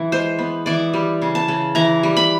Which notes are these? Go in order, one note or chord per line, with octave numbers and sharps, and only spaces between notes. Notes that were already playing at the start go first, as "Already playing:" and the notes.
Already playing: E3
G#3 C5
B3
E3 D5
G3
C#3
A5
C#3
E3 A#5
G3
B5